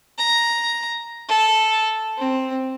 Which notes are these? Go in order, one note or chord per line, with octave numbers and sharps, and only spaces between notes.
A#5
A4
C4